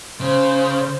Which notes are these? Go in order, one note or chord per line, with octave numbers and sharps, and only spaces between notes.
C#3 C5